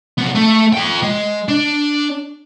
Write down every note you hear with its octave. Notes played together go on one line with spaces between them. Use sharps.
C2 B3
A3 A4
F4 G5
G#3
D4